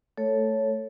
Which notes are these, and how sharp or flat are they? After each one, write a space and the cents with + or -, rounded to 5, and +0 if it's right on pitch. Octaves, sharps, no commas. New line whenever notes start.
A3 +0 A4 +0 C#5 +0